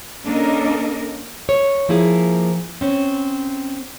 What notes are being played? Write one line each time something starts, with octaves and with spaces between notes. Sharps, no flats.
A#3 C#4 D4 A4 A#4 D#5
C#5
F3 A#3 E4 G#4
C4 C#4